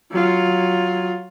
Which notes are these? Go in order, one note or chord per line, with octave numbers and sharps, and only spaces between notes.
F#3 F4